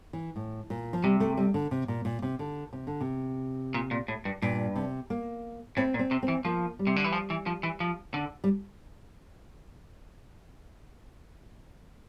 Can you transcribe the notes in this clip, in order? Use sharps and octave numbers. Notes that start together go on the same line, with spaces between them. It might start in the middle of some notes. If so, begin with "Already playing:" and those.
E3
A2
A#2
F3
C3 G3
A3
G3
D3
C3
A#2
A#2
C3
D3
C3
D3
C3
A#2
A#2
A2
G2
G2 A#2
C3
A#3
A2 C4
A#2
C4
C3
C4
E3
F3 A#3
G3
C3
D3
E3
F3
E3
F3
E3
F3
D3
G3